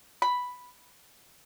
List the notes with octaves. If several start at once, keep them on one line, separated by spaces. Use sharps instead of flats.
B5